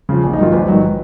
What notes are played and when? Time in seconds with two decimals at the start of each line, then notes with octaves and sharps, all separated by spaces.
0.09 C#3 F3
0.24 A#1
0.33 D#4
0.38 G#2 D#3 F#3 F4
0.52 A#1 B4
0.68 G#2 D#3 F#3